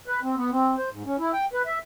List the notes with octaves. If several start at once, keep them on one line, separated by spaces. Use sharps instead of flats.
B4
C4
B3
C4
C5
G#2
C#4
E4
G5
B4
E5